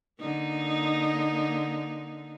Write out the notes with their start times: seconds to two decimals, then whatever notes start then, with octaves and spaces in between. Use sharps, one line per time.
0.20 D3 A#3 D#4